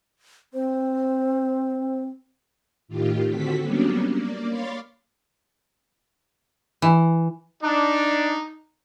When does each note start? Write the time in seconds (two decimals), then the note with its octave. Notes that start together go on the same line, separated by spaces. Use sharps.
0.53 C4 C5
2.88 A2 D#3 F4 G4
3.28 D3 C4 F#4 A4 B6
3.60 F#3 G3 A#3 B3 C#4 D4
4.08 A#3 D5
4.48 C#5 F5 B5 C6 D6 A6
6.82 E3
7.63 D4 D#4